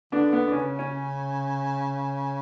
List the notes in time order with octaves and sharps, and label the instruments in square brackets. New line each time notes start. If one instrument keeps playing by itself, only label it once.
[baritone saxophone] D3 [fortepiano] B3 D4
[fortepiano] B3
D4
[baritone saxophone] C#3 [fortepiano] C#4
[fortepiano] C#4